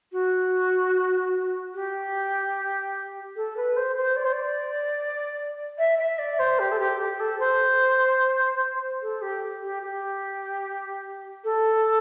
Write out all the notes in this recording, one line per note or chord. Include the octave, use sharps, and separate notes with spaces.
F#4
G4
A4
B4
C5
C5
D5
C5
D5
E5
E5
D5
C5
G4
A4
G4
G4
A4
C5
A4
G4
G4
G4
A4